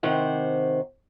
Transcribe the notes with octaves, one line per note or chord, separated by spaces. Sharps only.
C3 D#3 C5 F#5